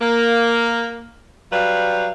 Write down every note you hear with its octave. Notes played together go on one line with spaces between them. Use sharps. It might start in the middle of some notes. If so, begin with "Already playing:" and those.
A#3
F#3 G3 B4 F5